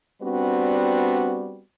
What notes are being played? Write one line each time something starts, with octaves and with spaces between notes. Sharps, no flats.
G3 B3 C4 D4 F#4